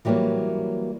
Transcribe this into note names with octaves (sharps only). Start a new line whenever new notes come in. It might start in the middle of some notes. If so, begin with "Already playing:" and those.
E3 F#3 G3 A3 A#3